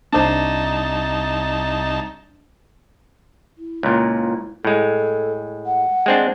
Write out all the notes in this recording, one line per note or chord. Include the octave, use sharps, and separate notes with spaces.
C2 D4 D#4 C5 A5
E4
C#2 A#2
A2 G#3 A4
F#5
G#3 C4 D4